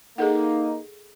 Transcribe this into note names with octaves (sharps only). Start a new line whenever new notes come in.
A#3 D#4 G#4 A4 F#5